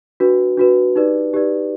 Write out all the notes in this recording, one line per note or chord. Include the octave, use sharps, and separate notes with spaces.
D4 F#4 B4
D4 F#4 B4
D#4 G4 B4 D5
D#4 G4 B4 D5